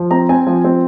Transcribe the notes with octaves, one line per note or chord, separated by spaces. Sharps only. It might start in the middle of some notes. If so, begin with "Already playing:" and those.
Already playing: F3
C4 A#5
C4 G#5
F3
C4